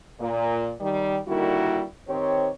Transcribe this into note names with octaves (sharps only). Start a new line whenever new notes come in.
A#2
D#3 G3
D3 D#3 G3 A#3 E4 F#4
D#3 C4 G4 C5 C#5